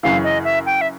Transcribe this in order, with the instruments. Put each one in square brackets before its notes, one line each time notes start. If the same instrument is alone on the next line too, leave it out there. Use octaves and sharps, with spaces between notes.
[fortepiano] F#2 C#3 E3 [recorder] F5
[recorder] D#5
E5
G5
E5